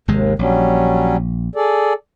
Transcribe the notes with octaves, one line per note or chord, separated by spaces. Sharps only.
G#1 D#2 C3 G#3
A#1 F#3 G3 C#4
G#4 A4 D5